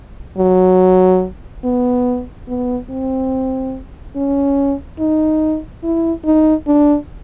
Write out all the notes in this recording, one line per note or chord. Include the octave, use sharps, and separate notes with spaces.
F#3
B3
B3
C4
C#4
D#4
E4
D#4
D4